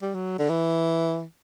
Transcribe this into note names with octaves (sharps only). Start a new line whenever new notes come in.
G3
F#3
D3
E3